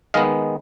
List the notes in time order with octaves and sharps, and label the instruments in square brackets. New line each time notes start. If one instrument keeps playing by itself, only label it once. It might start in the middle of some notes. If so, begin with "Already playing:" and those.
[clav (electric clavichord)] D#3 G#3 B3 D#5 F5